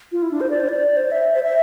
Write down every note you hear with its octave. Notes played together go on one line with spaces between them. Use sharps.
F4
E4
D4
C5
D5
C5
D5
C5
E5
C5
E5